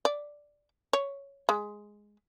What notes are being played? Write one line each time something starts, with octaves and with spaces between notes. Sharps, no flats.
D5
C#5
G#3